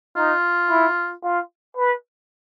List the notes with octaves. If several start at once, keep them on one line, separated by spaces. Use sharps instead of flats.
D#4 F4
E4
F4
B4